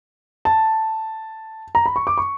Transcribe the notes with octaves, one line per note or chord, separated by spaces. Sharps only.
A5
A#5
B5
C#6
D6
C#6